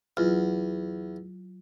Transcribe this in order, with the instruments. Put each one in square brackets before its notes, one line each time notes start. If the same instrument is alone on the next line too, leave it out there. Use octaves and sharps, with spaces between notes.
[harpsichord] E2 [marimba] F#3 F4